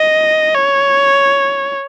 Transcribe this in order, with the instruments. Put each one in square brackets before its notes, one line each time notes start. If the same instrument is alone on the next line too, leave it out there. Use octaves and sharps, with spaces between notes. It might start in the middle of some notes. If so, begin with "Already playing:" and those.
Already playing: [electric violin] D#5
C#5